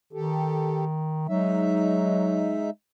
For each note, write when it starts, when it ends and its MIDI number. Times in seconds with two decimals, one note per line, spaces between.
0.13 1.27 51
0.13 0.85 67
0.13 0.85 69
1.29 2.60 54
1.29 2.70 56
1.29 2.70 63
1.29 2.70 76